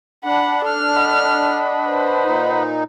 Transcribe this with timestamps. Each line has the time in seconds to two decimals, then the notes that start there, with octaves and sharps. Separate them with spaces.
0.25 D4 F#5 B5
0.66 A4 F6
0.96 D#5 F#5 B5
1.88 B4 C5
2.25 A#2 D#4